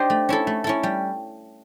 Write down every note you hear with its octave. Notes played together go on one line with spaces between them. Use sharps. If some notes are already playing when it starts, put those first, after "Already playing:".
Already playing: D4 G4 C5 D#5
A3
C#4 E4 A4
A3
C#4 E4 A4
G3